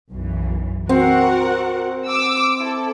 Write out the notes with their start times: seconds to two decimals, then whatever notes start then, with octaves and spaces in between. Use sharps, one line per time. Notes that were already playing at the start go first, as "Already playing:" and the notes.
0.11 B1 F#2 E3
0.89 C4 F#4 A#4 F#5
2.08 D6 E6
2.59 E4 A4